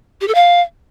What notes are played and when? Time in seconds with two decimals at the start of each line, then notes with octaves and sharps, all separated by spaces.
0.21 G4
0.28 A4
0.35 F5